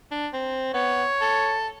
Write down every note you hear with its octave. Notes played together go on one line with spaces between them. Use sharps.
D4
C4
B3 C#5
A4